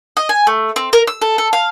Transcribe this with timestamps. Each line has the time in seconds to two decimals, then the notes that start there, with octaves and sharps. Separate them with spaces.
0.17 D#5
0.29 G#5
0.47 A3
0.76 C4
0.93 A#4
1.07 E6
1.22 A4
1.38 A4
1.53 F5